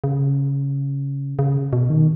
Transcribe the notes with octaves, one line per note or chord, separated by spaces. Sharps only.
C#3
C#3
B2
D#3